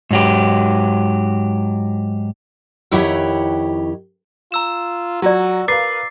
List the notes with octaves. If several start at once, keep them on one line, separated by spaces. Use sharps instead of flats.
G#2 F#3 G4
F2 D#3 E4 G4 C#5 F#5
F4 A#5 E6 E7
F#3 F4 F#4 D5
A#4 B4 F5 D6 A6 C7